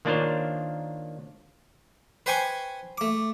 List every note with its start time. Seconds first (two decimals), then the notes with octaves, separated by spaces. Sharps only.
0.05 D#3 A#3 D4 F4 C5 C#5
2.26 B4 C5 G5 G#5 C#6
2.98 A3 D6